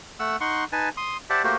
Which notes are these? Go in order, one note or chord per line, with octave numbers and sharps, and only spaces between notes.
A3 F#5 E6
D#4 F#5 C6 C#6
D#4 B4 G#5 A5
C6 D#6
G4 C5 D5 E5 F#5 A5
A3 A#3 F#4 G4 C5